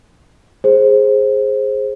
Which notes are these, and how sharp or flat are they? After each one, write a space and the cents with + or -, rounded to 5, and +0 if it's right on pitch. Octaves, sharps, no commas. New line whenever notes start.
G#4 +0 C5 +20